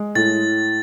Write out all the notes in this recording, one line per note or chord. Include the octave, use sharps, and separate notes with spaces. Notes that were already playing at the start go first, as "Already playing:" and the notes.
Already playing: G#3
A2 A6